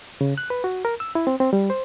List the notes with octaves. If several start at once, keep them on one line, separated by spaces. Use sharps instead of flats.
C#3
F#6
B4
F#4
A#4
E6
E4
C4
C4
G3
C5